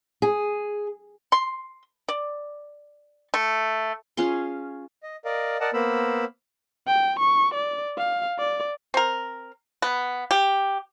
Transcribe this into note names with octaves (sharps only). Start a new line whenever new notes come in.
G#4
C6
D5
A3
C#4 F4 G#4 C6
D#5
A#4 D5 D#5 F5
A#4 D5 D#5 F#5 A5
A#3 B3 A#4 C5 B5 E6
G5
C#6
D5
F5
D5
C4 A#4
B3
G4